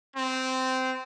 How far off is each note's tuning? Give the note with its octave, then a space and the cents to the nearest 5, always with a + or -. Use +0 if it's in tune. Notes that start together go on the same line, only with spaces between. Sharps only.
C4 -15